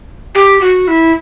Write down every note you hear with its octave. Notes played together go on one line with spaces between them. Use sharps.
G4
F#4
E4